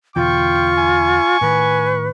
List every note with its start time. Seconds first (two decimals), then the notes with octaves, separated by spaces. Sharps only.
0.16 E2 B2 D3 F4 G5 C#6
0.77 G#5
1.41 A2 D#3 B4